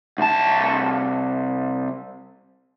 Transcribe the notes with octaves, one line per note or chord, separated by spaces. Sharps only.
C2 A5